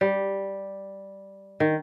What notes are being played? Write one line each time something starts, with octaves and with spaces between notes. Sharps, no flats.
G3
D#3